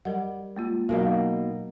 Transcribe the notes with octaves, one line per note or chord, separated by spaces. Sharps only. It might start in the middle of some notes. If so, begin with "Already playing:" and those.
G3 A#4 D#5 F#5
G#3 A#3 F4
B2 F#3 A#3 D#4